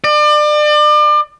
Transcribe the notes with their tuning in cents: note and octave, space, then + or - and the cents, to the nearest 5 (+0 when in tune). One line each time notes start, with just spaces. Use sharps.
D5 +35